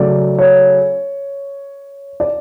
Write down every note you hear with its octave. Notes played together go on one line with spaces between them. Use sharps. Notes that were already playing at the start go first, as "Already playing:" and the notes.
Already playing: C#3 F#3 A3 D5
C#5
D5